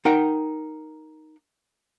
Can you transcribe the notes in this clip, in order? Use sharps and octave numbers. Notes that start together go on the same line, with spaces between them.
D#4 A#4 F#5 G5